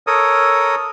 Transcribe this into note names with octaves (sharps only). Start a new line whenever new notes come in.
A4 A#4 C#5 D#6